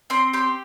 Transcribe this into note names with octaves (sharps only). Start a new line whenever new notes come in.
C4 C6
G4 C6